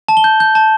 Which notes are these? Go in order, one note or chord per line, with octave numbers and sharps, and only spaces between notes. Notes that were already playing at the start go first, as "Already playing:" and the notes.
A5
G7
G6
G6
A5